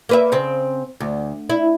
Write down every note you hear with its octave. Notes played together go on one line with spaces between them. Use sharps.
A#3 B4 E5
C#3 C4
D2
E4